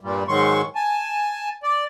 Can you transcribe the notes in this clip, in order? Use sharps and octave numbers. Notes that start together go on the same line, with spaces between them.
G2 A#2 G3
G#2 D#3 F#3 G#3 C6 C#6
G#5 A5
D5